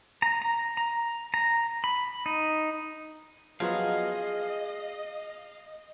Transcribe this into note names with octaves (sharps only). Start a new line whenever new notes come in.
A#5
A#5
A#5
A#5
B5
D#4
F3 F#3 B3 G#4 D#5 F5